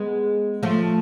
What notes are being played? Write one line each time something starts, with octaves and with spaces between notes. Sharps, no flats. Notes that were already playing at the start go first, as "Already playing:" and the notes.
Already playing: G#3 B3
F3 A3